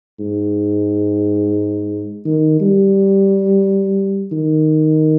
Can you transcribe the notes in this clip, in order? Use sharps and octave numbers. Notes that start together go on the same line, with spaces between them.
G#2
D#3
G3
D#3